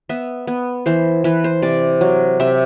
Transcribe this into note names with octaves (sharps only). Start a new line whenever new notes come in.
B3 E5
B3
E3 C5
E3 B4
C5
C3 D5
F#3
C3 E5